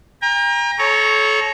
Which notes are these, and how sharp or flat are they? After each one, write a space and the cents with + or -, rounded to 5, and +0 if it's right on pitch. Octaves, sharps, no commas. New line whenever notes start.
G5 +45 A#5 +20
A4 -30 C#5 +0 A#5 +0